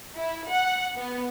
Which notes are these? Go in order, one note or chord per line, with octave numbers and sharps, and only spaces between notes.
E4
F#5
B3